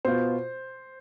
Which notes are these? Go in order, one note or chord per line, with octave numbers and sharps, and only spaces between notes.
B2 B3 F4 C5